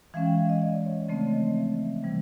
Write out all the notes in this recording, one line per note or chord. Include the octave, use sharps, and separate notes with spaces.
E3 G#3 C#4 F5
G5
F5
D#5
D5
C#5
C#3 F3 A3 C4 D5
D#5
E5
C3 E3 G3